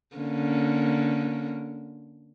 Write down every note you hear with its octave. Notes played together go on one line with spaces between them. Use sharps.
D3 A#3 C#4